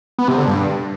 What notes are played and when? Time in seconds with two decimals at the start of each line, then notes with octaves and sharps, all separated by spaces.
0.18 B3
0.28 C3
0.38 D3
0.47 G2